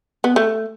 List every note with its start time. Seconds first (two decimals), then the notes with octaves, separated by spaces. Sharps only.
0.24 B3
0.36 A3